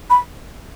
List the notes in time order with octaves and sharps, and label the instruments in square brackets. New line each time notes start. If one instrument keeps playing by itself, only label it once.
[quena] B5